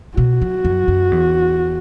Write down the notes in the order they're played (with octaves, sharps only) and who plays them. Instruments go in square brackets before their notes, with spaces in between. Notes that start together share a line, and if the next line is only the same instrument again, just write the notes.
[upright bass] B2 [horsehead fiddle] F#4
[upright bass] F#3
F#2
F#2
E2